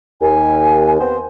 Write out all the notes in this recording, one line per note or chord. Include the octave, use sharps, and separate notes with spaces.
D#2 G#5
B3 C4 C5